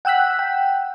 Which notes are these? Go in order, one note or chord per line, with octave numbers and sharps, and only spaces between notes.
F#5 G5 E6 F#6 B6
G5